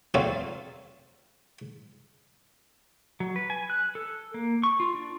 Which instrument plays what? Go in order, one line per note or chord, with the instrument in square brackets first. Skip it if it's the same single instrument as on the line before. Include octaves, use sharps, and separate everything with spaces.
[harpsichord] A#2 F#3 A3 C4 D5 F5
[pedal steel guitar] F#3
B4
G#5
F#6
A4
A#3
C#6
F4
D4